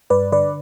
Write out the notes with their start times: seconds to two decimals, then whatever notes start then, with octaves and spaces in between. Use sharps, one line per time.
0.10 G2 B4 D5
0.32 D3 B4 D5